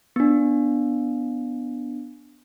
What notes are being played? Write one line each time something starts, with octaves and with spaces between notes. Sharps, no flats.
B3 D4